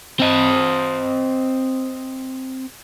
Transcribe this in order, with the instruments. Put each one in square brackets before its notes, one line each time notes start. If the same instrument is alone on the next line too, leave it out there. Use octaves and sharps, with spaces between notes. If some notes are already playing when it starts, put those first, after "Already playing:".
[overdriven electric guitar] C4 D#5